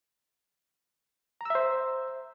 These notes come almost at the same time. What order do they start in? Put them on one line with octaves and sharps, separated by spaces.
A#5 E6 E5 C5